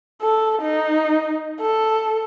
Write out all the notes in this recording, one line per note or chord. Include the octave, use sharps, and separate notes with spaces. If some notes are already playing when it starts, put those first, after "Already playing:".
A4
D#4
A4